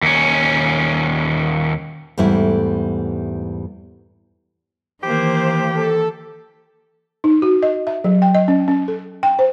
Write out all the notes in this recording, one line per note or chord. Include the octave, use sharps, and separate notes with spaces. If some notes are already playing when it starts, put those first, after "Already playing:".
D#2 C#4
E2 G#2 G3 A3 E4
D#3 E3 A#3 G4 C5
A4
D#4
F#4
D#5
E5
F#3
G5
D#5
C#4
C#4
A4
G5
C5